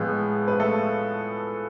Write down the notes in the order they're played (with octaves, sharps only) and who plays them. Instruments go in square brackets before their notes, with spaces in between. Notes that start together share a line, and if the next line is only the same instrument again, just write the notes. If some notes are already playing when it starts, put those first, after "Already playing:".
Already playing: [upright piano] A2 F3 B3 F4 [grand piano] G#3
[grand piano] B4
A3 A4